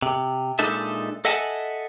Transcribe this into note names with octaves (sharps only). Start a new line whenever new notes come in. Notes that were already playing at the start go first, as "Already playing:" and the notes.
C3
A#2 G#3 D4 D#4 A4 E5
A4 D#5 E5 F#5 G#5 A5